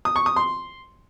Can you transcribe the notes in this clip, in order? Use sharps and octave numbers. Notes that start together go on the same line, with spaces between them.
D#6
C#6
D#6
C6